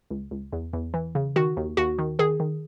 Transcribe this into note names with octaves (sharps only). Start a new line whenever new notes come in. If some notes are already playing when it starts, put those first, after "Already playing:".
C#2
C#2
E2
E2
E3
C#3
D#3 F#4
D#2
D#2 F#4
D#3
D#3 G#4
D#3